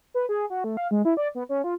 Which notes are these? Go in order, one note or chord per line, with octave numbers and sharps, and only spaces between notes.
B4
G#4
F#4
A3
F5
G#3
E4
D5
B3
C#4
F4